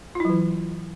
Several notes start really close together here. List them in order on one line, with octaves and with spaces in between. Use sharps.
F4 E4 F#3 E3